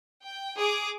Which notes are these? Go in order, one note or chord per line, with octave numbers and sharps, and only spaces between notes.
G5
G#4 D6